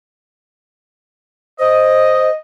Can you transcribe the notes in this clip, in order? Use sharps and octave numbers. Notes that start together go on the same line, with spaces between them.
C5 D#5